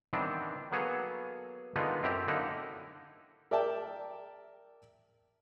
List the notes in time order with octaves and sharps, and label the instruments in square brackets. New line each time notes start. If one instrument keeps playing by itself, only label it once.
[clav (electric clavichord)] D#3 E3 G3 B3 C4 D4
F#3 A#3 B3 G#4 A4 C#5
D3 D#3 G#3 B3 D#4 F4
F#2 C4 E4 G4 A#5
D3 A#3 D#4 E4 F#5
[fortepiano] A#4 D5 E5 G5 A5